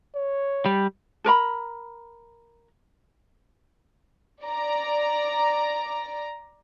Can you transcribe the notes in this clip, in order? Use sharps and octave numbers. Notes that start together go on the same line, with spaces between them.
C#5
G3
A4 A#4 A#5 B5
D5 A#5